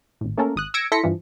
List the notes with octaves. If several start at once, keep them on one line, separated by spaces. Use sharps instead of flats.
G#1 A2
A3 A#3 C#4 A4 A#4
G#1 D#6 F#6
E6 G#6 A#6 C#7 D7
E4 A4 C6 A#6 B6 C#7
G2 E3 F3